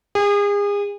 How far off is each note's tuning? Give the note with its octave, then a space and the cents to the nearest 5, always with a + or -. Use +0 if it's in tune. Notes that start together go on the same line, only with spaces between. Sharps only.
G#4 -35